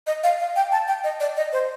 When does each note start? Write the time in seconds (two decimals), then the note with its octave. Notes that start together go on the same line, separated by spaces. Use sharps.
0.07 D#5
0.23 F5
0.40 F5
0.56 G5
0.72 A5
0.88 G5
1.04 D#5
1.20 D5
1.37 D#5
1.52 C5